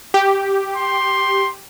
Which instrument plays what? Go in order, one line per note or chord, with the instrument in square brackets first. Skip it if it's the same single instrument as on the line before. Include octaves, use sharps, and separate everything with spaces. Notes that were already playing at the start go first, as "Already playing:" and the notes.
[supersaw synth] G4
[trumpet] C6